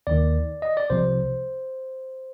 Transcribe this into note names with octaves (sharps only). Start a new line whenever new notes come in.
D#2 D#3 D5
D#5
D5
C2 C3 F3 C5